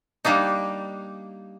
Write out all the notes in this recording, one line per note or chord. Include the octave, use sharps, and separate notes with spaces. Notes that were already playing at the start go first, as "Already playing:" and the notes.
G3 A#3 D4 D#4